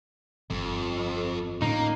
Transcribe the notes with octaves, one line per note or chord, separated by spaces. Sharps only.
G1 F2
A2 D3 A#3 C#4 D#4